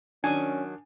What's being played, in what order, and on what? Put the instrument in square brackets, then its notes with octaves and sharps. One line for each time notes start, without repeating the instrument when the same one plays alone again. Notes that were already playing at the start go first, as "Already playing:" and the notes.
[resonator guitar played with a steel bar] D#3 F#3 [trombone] C#4 [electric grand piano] D4 [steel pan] G#5